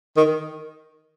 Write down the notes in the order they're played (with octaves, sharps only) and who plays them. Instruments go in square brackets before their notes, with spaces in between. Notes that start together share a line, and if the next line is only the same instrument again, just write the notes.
[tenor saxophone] D#3